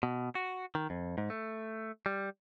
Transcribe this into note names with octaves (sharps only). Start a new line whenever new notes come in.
B2
F#4
D#3
F2
G#2
A3
G3